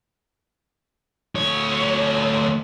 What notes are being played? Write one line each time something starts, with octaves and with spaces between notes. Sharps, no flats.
D2 C#5